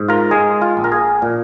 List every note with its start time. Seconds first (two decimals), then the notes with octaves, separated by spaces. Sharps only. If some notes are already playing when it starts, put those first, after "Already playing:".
Already playing: G#2
0.09 F4 A#4
0.31 G#3 G#4
0.62 F4
0.77 A#1
0.84 A#4
0.92 G#4
1.22 A#2